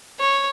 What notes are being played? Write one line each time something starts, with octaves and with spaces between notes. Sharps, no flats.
C#5